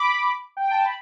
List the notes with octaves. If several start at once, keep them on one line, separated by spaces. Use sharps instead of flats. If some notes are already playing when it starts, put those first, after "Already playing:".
Already playing: B5 D6
G5
A5
B5